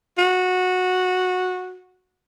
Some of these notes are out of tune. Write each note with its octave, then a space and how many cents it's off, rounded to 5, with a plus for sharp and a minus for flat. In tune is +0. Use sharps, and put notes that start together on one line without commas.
F#4 -15